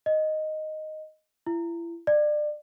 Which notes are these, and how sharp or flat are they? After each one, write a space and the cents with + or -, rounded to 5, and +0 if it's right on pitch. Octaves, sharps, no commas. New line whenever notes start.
D#5 -5
E4 +35
D5 +30